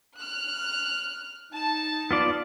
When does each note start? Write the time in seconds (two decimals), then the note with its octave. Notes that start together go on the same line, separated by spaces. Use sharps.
0.17 F6 F#6
1.53 D#4 A5
2.11 B3 F4 D5